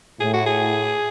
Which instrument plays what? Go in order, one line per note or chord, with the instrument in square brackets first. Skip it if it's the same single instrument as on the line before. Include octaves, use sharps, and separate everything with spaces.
[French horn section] A2 [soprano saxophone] G#4
[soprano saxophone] F#4
G#4